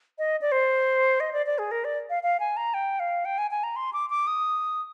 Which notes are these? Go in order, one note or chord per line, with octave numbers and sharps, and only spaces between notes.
D#5
D5
C5
D#5
D5
D5
G#4
A#4
D5
F5
F5
G#5
A#5
G5
F5
G5
G#5
G#5
A#5
C6
D6
D6
D#6